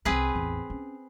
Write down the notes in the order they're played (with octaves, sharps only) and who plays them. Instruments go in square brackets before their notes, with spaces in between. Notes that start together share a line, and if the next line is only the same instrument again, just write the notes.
[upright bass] C2 D#3 [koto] C4 G#4 B4
[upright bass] A1 E2
C#4